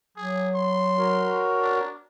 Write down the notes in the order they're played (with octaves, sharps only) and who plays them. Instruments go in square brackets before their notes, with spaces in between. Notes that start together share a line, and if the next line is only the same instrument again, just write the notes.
[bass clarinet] F#3 [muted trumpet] G#4
[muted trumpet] C6
[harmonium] F#4 A#4 C#5
[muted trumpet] D4